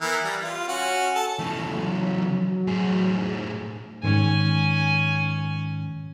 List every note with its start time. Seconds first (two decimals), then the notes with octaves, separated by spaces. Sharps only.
0.01 E3 B3 A#4
0.24 G3
0.42 F4
0.68 C#4 F#4
1.15 A4
1.39 C#3 E3 A3
1.75 F#3
2.67 A2 G#4
4.03 G#2 D#3 G#3 C#4 G#5